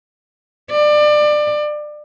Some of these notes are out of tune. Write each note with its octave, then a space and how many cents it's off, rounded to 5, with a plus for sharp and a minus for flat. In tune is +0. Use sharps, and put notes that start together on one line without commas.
D5 +25